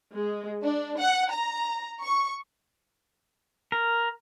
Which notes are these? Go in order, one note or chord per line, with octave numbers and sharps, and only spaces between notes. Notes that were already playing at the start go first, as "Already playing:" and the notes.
G#3
D4
F#5
A#5
C#6
A#4